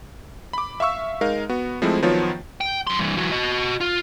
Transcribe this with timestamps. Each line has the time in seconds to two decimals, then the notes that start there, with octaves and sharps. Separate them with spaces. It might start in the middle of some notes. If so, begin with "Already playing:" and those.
0.53 B5 D6
0.80 E5 F5 C#6 E6
1.21 G#3 D#4 A#4 F5
1.49 B3 F#4
1.82 F3 G#3 A3 C4 E4
2.02 D#3 F3 F#3 B3 F4 C#5
2.61 G5
2.87 F#2 C6
2.99 G2 E3
3.17 E3 F#3
3.32 F#4 D#5
3.80 F4